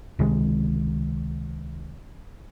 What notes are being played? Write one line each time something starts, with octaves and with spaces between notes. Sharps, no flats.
C#2 C3 D#3 G#3